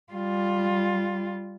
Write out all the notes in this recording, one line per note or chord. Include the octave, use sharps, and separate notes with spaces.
G3 F4